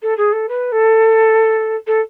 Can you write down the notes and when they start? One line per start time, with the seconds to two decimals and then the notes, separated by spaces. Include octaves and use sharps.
0.02 A4
0.17 G#4
0.32 A4
0.48 B4
0.72 A4
1.87 A4